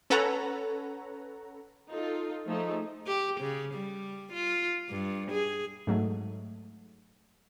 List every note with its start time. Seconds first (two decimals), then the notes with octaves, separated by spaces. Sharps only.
0.10 C#4 A4 B4 C#5 F#5 A#5
1.90 D#4 F4 A4
2.47 F3 A3 D#4 G#4 E5
3.07 G4
3.41 C#3
3.74 G3
4.33 F4
4.89 G2
5.31 G#4
5.87 G#2 F#3 A3